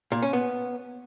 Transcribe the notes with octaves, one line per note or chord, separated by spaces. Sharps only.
A#2
C#4
B3